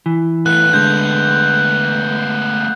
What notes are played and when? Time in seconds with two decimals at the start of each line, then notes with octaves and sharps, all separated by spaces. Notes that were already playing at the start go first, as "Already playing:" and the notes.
0.06 E3
0.46 A3 B3 F#6
0.73 D3 G#3 G6